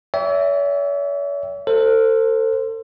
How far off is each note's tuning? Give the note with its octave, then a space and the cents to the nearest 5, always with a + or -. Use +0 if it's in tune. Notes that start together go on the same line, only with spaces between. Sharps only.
C#5 +45 E5 +0 G5 +0
A4 +35 C5 +0